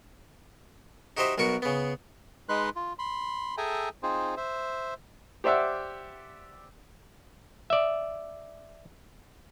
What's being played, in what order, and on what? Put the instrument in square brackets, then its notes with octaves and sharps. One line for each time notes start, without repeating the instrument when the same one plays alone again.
[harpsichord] D#4 F#4 G4 C5 D#5 E5
B1 B2 F#4 A#4 C#6
C#3 B3
[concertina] G#3 D#4 B4 C6 F#6
F4
B5 C6
G#4 A4 E5 G5 G#5 A#5
C4 D#4 F4 G#4 C5
C5 E5
[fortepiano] G4 C5 D5 E5 F#5
[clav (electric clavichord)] D5 E5